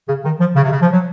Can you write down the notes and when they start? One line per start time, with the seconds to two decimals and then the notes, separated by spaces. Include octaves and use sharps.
0.08 C#3
0.24 D#3
0.40 F3
0.56 C#3
0.63 C3
0.71 C#3
0.81 F3
0.92 F#3